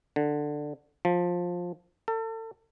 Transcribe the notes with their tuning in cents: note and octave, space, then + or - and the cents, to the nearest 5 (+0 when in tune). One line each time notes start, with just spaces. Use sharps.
D3 +15
F3 +15
A4 +35